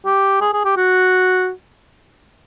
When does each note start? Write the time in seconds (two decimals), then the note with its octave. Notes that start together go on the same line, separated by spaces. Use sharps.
0.05 G4
0.41 G#4
0.53 G#4
0.65 G4
0.77 F#4